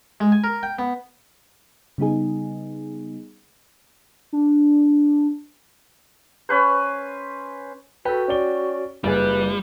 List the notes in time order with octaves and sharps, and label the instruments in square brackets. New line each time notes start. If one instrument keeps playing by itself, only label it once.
[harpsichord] G#3
G#5
A#4
G5
B3
[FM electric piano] C#3 G3 B3 D#4 G#4
[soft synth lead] D4
[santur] C#4 B4 C5
[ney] F#4 [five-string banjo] G4 [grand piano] A4 B4
[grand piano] C#4 D5 G7
[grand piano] F#1 [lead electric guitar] G3 [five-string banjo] F4 G#4 [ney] B4